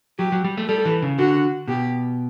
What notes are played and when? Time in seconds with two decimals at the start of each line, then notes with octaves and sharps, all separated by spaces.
0.19 F#3 G4
0.32 F#3
0.44 G3
0.57 A3
0.68 G3 A4
0.85 E3
1.02 C#3
1.19 D3 F#4
1.68 B2 G4